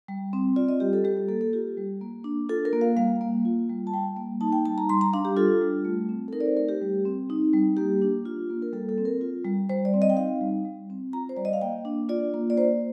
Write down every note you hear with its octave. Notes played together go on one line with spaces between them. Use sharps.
G3
C4
F4 D5
D#5
G3 G4
A4
G3 G4
A4
A#3 A4
A4
F4 G4
G3
A#3
D4
F4 A4
A#4
A#3
F5
G3 F5
A#3
F4
G3
A5
G3 G5
A#3
D#4 A5
G5
G3 A5
A#5
G3 C6
A#5
D4 F5
G4
F4 A4
G3
A3
C4
A4
D#4 A#4
D5
C5
A3 A#4
G4
G3
C4
D#4
G3
A#3 G4
D4
F4
A#3
A#4
G3 A4
A4
C4
A#4
F4
G3
G3 C5
D5
C4
D#5
G5
D#4 F5
G3
G3
C4
F4 A#5
C5
G3 D5
D#5
F5
A#3 G5
D4
F4 D5
A#3
D5
A#3 C5